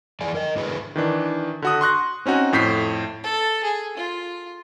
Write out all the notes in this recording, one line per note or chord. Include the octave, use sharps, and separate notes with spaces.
F2 E3 G#4 D5 G#5
A#4 D#5
G#2 D3 E4 G#4 B4
D#3 E3 D4
D3 F#4 D#6
C6 C#6 F#6 A#6
C4 C#4 D#4 F#4 G#5
F2 A2 G6 B6 C7
A4
G#4
F4